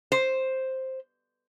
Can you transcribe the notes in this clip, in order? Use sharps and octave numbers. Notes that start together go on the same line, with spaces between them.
C5